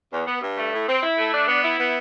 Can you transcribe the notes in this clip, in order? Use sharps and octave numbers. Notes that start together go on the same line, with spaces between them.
E2
B3
G2
A3
A2
C4
E4
A3
D4
B3
E4
B3